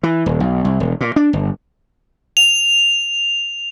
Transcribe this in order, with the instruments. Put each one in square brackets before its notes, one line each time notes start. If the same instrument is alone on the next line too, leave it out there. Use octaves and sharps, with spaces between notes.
[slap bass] E3
D#1
B1
C2
E1
A#2
D4
G1
[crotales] F7